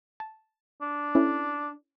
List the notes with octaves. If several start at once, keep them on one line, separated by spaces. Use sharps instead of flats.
A5
D4
C#4 E4 A4